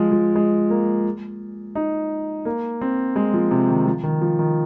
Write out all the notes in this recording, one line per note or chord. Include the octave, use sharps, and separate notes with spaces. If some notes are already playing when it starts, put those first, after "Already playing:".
Already playing: F3 G#3
F3
G#3
A#3
D#4
A#3
C4
G#3
F3
C3
D#3
F3
D#3
F3
D#3